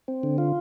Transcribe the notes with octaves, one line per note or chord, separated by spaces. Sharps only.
C4
D3
F4